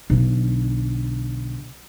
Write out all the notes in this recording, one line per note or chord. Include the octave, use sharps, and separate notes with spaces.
B1 D3